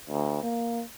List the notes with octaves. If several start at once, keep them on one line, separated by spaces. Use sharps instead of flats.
D2
A#3